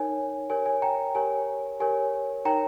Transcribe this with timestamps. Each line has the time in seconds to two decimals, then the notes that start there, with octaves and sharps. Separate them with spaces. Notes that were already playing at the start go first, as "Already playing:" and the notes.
Already playing: D#4 A#4 C#5 G#5
0.49 G4 A#4 C#5 G#5
0.66 G#5
0.82 G5 A#5
1.15 G4 A#4 C#5 G#5
1.80 G4 A#4 C#5 G#5
2.45 D#4 A#4 C#5 G5 A#5